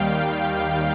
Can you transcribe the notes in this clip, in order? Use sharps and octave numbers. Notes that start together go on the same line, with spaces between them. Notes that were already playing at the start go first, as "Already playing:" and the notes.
Already playing: D#2 D#3 G3 F5 G5